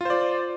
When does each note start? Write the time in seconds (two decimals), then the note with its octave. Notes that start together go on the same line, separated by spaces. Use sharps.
0.01 F4
0.05 C5
0.10 D5